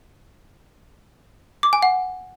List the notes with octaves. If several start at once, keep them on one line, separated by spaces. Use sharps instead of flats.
D6
G#5
F#5